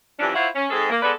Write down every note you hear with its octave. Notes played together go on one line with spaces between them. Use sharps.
G2 E3 F3 C#4 D4
E4 F4 C5 C#5 E5 F#5
C#4
G#2 G#3 C4 G#4 A4
A#3
G#3 B3 A4 B4 D5